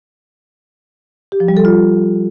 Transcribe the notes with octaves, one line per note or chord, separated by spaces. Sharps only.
G4
F3
G3
A4
F4